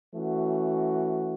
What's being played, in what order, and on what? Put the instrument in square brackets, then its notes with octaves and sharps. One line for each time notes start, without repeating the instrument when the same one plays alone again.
[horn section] E3 A3 C#4 F#4